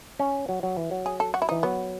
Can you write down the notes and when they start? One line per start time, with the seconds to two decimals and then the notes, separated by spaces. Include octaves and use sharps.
0.19 C#4
0.49 F#3
0.63 F#3
0.77 E3
0.91 F#3
1.06 G#4
1.20 A4
1.34 F#4
1.42 E4
1.49 E3 D#4
1.63 F#3 B3